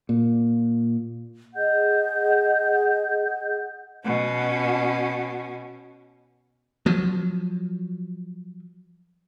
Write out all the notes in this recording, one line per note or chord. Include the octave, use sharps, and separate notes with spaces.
A#2
G#4 D#5 F#5 G6
B2 C#4
F3 F#3